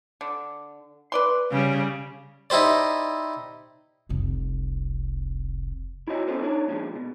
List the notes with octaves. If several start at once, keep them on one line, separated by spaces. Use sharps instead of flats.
D3
B4 D5 C6
C#3 G3
D#4 E4 G4 C5 D5
F1 C2
E4 F#4 C#5 D#5
B3 C#4 F4 A4 C5
D4 D#4 C#5
A#2 F3 G#3
B2